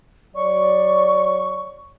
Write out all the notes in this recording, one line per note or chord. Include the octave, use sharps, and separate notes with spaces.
F#3 C#5 D5 C#6